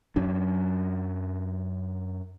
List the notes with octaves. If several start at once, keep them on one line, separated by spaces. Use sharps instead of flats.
F#2 F#3 C#4 D4